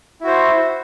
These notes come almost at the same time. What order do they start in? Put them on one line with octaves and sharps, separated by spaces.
E4 F#4 C5